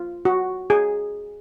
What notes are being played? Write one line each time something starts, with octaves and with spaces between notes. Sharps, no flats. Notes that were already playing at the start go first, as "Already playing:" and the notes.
Already playing: F4
F#4
G#4